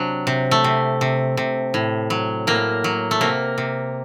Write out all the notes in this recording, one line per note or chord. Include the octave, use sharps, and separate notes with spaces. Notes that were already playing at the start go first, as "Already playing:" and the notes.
Already playing: C3 F#3 D4
C3
A3
C3
C3
C3
A2
F#3
A2 A#3
F#3
A3
C3 A#3
C3